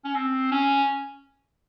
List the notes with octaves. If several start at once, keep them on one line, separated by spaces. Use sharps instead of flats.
C#4
C4
C#4